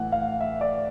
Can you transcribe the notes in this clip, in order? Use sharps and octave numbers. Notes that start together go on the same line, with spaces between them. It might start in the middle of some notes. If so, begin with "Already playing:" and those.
Already playing: A2 E3 F#5
F5
E5
D5